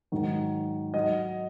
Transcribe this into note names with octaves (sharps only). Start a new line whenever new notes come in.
G#2 D#3 F#3
F#3 D#5